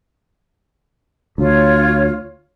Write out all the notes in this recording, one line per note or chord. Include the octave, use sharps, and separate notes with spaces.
D2 F4 C#5